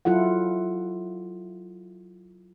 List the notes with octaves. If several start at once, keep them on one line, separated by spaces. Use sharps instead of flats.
F#3 E4 F4 A4 F#5